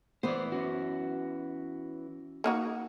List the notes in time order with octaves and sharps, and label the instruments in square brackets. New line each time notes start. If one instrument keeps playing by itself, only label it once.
[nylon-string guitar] E3 B3 [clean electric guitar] C5 D5
[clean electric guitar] C#4 F#4
[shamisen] A#3 D#4 F#4